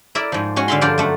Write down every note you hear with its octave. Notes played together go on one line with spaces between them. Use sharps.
E4 A#4 D5 E5
G#2 F3
G#3 C#4 F#4
D3 E5 F5 B5 C6
G2 F3 F4 A#4 C5 D5
F#2 A3 F#5